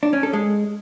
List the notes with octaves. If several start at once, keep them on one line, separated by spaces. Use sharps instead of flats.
D4
C#4
A4
G#3